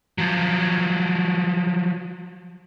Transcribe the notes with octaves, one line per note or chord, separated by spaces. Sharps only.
F3 F#3